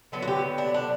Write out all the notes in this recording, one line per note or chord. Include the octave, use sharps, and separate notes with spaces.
D3 F#3 B3 A4
F#4
G4
D4
D4